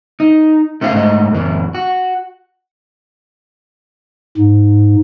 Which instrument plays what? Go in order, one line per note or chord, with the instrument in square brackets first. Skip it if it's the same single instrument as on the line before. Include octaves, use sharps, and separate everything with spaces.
[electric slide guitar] D#4
A3 C#4 E4 D5 F5
G#2 A3 D#5
F#2 E3
F#4
[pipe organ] G#2